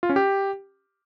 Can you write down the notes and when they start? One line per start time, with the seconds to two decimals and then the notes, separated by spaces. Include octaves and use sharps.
0.03 F4
0.09 C#4
0.16 G4